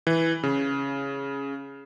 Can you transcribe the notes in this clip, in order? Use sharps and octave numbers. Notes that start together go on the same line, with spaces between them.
E3
C#3